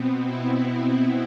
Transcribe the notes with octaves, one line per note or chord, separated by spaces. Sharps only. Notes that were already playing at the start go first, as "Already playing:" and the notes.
Already playing: B2 B3 C4
E4